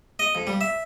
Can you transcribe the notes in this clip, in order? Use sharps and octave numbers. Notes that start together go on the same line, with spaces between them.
D#5
F2
G3
E5